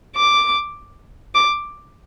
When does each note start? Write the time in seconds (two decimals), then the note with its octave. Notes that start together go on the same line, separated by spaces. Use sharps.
0.16 D6
1.35 D6